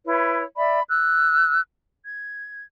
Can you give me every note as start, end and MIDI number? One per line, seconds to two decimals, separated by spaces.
0.05 0.42 64
0.05 0.42 71
0.05 0.42 73
0.57 0.81 74
0.57 0.81 76
0.57 0.81 83
0.89 1.60 88
0.89 1.60 90
2.04 2.63 92